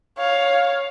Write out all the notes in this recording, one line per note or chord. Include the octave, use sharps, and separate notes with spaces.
C#5 F5